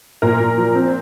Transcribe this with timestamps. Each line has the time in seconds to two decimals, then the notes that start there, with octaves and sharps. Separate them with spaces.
0.22 A#2 A#4
0.40 A#2
0.57 F3
0.75 C4